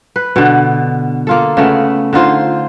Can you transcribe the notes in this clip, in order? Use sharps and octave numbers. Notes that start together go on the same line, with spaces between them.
B4
B2 D3
A#3 F4 A4
C#3 A3 B3
D3 D#4 F4 C5